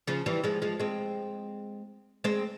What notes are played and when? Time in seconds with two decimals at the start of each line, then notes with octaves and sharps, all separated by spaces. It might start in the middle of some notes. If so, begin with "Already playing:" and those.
0.07 C#3 F3
0.26 E3 G3
0.44 F3 G#3
0.62 F3 G#3
0.79 G#3 C4
2.24 G#3 C4